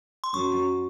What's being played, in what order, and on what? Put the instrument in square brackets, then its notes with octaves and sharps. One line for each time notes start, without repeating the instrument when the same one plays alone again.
[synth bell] C6
[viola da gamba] F#2 [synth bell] C#6